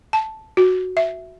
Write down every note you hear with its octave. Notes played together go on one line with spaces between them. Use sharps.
A5
F#4
E5